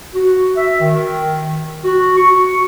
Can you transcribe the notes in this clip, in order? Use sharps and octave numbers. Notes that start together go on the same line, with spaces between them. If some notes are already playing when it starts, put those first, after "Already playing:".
F#4
E5
D#3
F#4
C#6